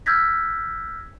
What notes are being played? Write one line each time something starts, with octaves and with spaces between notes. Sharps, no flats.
E6 F6 G6 G#6 A#6 B6